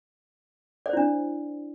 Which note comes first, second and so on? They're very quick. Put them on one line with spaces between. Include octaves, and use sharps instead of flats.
D5 C5 E4 D4